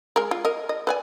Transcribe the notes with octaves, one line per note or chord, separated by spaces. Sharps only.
G#3 A#4
F4
A#4 D#5
D#5
B4 D5 G#5